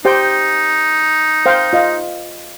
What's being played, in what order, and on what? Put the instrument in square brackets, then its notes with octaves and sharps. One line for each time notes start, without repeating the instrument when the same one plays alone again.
[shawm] D#4 [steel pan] G4 C5 G5
[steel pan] C5 F5 G5
F4 D#5 F5